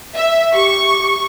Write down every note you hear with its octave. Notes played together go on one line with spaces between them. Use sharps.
E5
G4 C#6